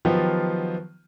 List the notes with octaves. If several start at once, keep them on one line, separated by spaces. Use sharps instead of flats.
D#3 F3 F#3 B3 F4 G4